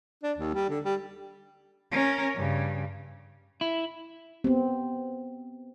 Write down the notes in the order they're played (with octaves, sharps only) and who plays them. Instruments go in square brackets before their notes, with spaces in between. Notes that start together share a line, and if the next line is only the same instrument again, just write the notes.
[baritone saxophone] D4
D#2
G3
D3
G3
[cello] C#4 A#4
G2 C#3
[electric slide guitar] E4
[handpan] B3 C4